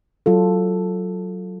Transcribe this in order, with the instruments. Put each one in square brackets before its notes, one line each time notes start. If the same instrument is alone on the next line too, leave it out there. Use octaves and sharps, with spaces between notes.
[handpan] F#3 F4 A4